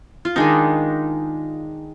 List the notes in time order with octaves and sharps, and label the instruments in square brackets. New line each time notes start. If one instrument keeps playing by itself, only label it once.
[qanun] F4
D#3 G#3 D4 D#4